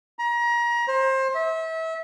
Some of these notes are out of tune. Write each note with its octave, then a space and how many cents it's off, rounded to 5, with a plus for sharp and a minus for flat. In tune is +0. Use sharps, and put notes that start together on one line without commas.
A#5 +30
C5 +25
E5 -30